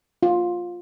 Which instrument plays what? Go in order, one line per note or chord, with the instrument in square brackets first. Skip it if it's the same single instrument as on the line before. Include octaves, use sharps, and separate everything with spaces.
[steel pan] F4